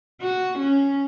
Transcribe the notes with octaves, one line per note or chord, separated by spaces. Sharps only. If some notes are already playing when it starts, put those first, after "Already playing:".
F#4
C#4